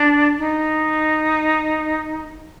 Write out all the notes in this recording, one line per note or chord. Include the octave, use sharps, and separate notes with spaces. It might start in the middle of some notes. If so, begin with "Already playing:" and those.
Already playing: D4
D#4